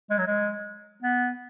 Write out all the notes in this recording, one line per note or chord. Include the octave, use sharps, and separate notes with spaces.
G#3
F#3
G#3
B3